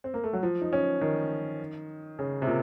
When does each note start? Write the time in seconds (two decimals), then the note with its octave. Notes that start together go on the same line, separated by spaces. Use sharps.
0.04 C4
0.14 A#3
0.24 A3
0.33 F#3
0.43 F3
0.62 D#4
0.73 C#4
1.01 D#3
2.19 C#3
2.42 C3
2.47 A#2